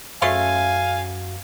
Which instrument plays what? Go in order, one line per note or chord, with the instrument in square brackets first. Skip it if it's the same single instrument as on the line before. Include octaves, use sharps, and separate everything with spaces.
[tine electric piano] F#2 F#4 [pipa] C#3 A3 C6 [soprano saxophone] F5 [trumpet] G#5